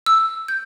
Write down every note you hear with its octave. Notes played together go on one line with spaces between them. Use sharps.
E6
G6